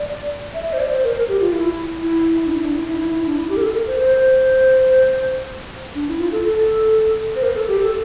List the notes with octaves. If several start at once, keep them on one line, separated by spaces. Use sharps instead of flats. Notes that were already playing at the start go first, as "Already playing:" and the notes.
Already playing: D5
E5
E5
C5
D5
C5
A#4
A#4
G4
F4
E4
E4
D4
E4
D4
E4
E4
E4
E4
D4
E4
G4
A#4
A4
A#4
C5
C5
D4
E4
F4
A4
A4
C5
A#4
A4
G4
A4